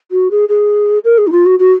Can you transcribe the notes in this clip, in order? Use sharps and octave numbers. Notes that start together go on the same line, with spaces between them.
F#4
G#4
G#4
A#4
G#4
D#4
F4
F#4
F#4